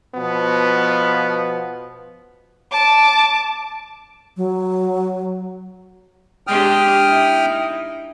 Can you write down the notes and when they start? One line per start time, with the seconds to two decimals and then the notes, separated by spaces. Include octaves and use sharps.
0.15 B2 F3 B3
2.72 A5 D6
4.37 F#3
6.47 G#3 D4 G4 G5 D#6 F6
7.08 D#4 E4